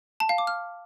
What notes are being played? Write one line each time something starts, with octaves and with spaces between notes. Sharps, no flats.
A5
F5
D6
F6